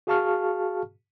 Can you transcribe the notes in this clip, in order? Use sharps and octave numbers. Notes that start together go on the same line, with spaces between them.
F#4 G#4 F5 A5 C#6 F6